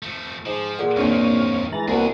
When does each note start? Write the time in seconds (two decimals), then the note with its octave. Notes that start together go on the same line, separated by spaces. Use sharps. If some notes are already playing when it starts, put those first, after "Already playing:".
0.03 F3 A3
0.46 G#2 F3
0.79 A#2 G#4 A4 F#5
0.97 F2 D#3 A#3 C4 D4 C#5 F5 D#7
1.72 E3 G#3 A#5 A6 F#7
1.88 C2 A#3 B3 F#4 G#4 A#4